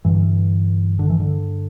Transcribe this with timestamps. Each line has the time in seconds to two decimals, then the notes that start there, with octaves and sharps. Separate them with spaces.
0.05 G2 D3 E3
0.99 D3
1.09 E3
1.20 D3